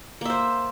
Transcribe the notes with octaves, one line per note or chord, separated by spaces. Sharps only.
A#3 C5 E5